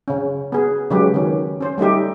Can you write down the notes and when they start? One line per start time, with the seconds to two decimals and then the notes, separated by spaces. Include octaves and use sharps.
0.08 C#3 C#4
0.52 B3 G#4
0.90 C#3 F#3 G#3 G4 B4
1.14 D#3 C#4
1.61 C#4 C5
1.78 G3 A3 D#4 G4